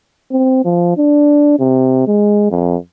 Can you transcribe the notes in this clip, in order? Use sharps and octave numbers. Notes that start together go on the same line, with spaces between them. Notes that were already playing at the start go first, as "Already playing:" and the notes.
C4
F3
D4
C3
G#3
F2